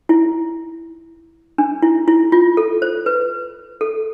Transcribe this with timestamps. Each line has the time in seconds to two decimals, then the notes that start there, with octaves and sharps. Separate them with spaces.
0.09 E4
1.58 D4
1.82 E4
2.08 E4
2.32 F4
2.57 A4
2.82 C5
3.06 B4
3.81 A4